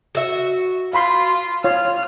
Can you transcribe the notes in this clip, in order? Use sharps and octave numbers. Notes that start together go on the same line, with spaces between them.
F#4 E5
F4 F5 B5 C6
F4 C#5 F6